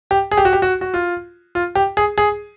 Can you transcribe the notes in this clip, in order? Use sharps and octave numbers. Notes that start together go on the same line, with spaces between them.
G4
G#4
G4
F#4
G4
F#4
F#4
F4
F4
G4
G#4
G#4